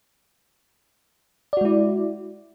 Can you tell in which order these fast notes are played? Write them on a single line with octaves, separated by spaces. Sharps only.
D5 F#4 G#3 E4